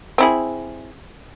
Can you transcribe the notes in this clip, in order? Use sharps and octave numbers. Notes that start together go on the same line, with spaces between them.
C4 E4 G#4